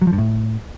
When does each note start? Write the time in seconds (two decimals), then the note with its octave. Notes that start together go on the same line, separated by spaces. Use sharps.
0.02 F#3
0.07 F3
0.13 G2
0.18 A2